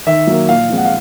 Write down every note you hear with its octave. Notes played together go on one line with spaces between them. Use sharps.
D#3 E5
F#3 A#3
A#2 F5
F3 G#3 C4
F#5
F5